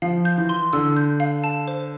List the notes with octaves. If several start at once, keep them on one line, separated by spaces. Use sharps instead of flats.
F3 F5
G6
E3
C6
D3 E6
G6
F5
A5
C5